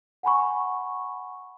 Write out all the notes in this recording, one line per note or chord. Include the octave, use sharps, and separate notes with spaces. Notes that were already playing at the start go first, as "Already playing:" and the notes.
F#5 G#5 B5 C#6